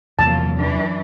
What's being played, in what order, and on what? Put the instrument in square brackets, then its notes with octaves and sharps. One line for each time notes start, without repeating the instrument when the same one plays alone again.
[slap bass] E2 C3 F3 [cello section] F#3 A#3 F4 [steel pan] A5
[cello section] F#2 E3 D4